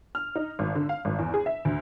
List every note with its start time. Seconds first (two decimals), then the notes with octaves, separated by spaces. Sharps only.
0.15 F6
0.35 D#4
0.59 G#1
0.75 D3
0.89 F5
1.05 G#1
1.19 E2
1.34 G#4
1.46 E5
1.65 D2